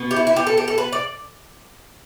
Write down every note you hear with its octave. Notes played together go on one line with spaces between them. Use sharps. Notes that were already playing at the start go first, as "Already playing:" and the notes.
Already playing: B2 B3
G4
E4
E4
G4
A4
G4
A4
B4
D5